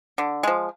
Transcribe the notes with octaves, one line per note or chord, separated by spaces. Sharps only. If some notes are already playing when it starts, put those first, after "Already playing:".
D3
F3 G#3